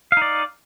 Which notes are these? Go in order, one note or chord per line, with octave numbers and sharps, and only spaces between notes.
D#4 D5 F5